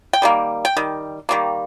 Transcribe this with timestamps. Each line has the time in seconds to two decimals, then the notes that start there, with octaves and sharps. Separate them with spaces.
0.13 G5
0.22 D#3 G3 A#3
0.65 G5
0.77 D#3 G3
1.29 D#3 G3 A#3